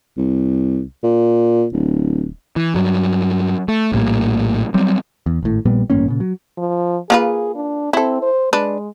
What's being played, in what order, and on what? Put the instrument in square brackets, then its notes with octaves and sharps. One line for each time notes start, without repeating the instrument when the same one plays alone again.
[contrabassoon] C2
A#2
D1
[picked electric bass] E3
G2 F#3
A3
A#1 A2 G3 A#3
F#3 G3 C4
E2
G#1 A2
A#1 A#2 G3 B3
A1 G2 A#3 C#4
A#2 C#3
F#3
[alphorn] F3
[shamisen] A#3 F4 B4 [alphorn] G#4
[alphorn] D4
[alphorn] C4 [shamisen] E4 A4
[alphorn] C5
[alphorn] G#3 [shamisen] D4 B4